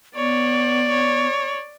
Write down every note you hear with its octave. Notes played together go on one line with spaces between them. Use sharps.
B3 C#5 D5
C#5